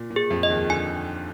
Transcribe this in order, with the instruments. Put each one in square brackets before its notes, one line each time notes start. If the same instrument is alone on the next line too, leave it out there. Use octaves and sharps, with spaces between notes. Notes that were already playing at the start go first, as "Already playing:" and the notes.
Already playing: [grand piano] A#2
A#2
[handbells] G#4
[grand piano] F2 F3
[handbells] D#5
[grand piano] D#2 D#3
[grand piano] D3 [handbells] G#5